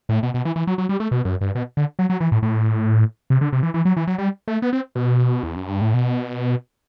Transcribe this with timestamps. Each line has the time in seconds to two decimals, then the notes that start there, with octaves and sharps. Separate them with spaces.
0.09 A2
0.23 B2
0.34 B2
0.45 E3
0.56 E3
0.67 F#3
0.78 F#3
0.89 G3
1.00 A3
1.11 B2
1.25 F#2
1.41 G2
1.55 B2
1.77 D3
1.99 F#3
2.10 F#3
2.20 E3
2.32 A2
2.42 A2
3.30 C3
3.41 D3
3.52 C3
3.63 E3
3.74 E3
3.85 F#3
3.97 E3
4.07 F#3
4.18 G3
4.48 A3
4.62 B3
4.73 C4
4.95 B2
5.43 E2
5.56 F#2
5.68 G2
5.81 A2
5.94 B2